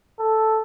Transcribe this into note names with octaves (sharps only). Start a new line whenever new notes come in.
A4